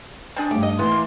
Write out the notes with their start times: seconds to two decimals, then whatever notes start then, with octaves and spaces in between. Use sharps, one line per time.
0.36 C4 D4 G#4
0.51 G2 A3 G4
0.63 D#5
0.79 E3 B3 C6
0.91 A#3